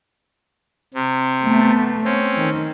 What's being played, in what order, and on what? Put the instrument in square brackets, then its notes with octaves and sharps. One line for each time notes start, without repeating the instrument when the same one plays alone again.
[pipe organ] C3
[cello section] A3 B3
[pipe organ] C4 C#4
[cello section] D#3